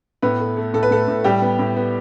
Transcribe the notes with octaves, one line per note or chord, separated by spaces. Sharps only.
A2 B3 B4
A3
A3
A2 A4
B4
A2 A3 A4
A2
A2 G3 G4
B3
A2
B3